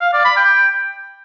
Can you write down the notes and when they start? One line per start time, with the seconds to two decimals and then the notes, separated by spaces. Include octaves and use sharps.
0.01 F5
0.13 D5
0.25 B5
0.37 G5